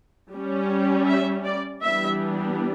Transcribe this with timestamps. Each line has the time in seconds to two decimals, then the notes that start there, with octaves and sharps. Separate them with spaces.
0.33 G3 C#4
1.08 E5
1.45 D5
1.82 E3 G3 B3 D4 E5